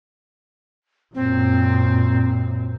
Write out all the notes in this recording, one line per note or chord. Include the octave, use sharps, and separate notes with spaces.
F#2 A#2 C4